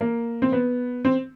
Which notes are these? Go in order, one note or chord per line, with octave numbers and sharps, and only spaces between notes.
A#3
C4
B3
C4